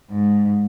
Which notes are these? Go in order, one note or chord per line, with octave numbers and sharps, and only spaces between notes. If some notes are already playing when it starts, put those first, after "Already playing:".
G#2